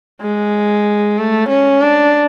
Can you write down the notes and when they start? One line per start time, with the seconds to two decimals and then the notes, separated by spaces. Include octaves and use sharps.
0.22 G#3
1.18 A3
1.50 C#4
1.82 D4